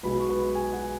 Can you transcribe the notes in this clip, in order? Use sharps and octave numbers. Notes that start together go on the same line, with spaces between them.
B1 B2 G#3 B4 B5
C#6
B4 B5
G#4 G#5
F#4 F#5